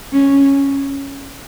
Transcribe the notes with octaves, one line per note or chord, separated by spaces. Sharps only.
C#4